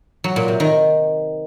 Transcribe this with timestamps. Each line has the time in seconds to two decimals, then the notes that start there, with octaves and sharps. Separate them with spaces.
0.24 F#3
0.36 A#2
0.48 C3
0.60 D#3